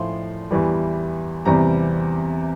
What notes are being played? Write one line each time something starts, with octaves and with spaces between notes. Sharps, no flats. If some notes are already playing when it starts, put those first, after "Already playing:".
Already playing: A2 F3 C6
E2 E3 G3
E2 C3 G3 A#5